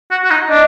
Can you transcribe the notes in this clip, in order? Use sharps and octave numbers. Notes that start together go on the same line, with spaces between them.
F#4
F#4
D#4
D4 D#5